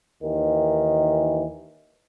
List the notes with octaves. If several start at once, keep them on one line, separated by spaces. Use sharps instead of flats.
D#2 D#3 E3